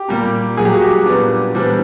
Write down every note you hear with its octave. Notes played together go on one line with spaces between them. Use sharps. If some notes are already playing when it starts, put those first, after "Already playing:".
Already playing: G4
A#2 G3 A#3
A#2 F#3 A#3 G#4
G4
F#4
G4
A#2 G3 B3 D4
C3 E3 G3 B3 D4